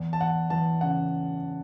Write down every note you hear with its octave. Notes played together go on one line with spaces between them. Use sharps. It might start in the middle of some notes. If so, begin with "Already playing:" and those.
Already playing: E2
A5
E2 F#5
E3 A5
C#3 F#5